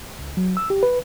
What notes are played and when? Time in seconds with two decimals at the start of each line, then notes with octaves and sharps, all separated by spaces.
0.19 C#2
0.37 F#3
0.57 E6
0.70 G4
0.83 B4